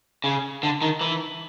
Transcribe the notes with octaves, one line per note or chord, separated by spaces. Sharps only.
C#3
D3
D#3
E3